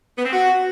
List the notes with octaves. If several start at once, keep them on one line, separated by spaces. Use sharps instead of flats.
B3
C4
F#4